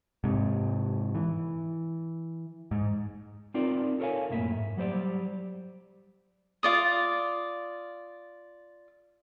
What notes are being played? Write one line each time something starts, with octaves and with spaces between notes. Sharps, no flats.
G#2 C3
E3
G#2
C4 D#4 F4 A#4 D5
A4 A#4 C#5 E5 F5 G#5
B1 F#2 A2 A#3 E5
G#2
F#3 G3 C5 D5
F4 D5 D#6